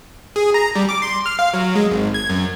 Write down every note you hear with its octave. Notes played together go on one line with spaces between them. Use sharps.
G#4
A#5
G3
D6
C6
F6
F5
F#3
G#3
G#1
G#6
F#2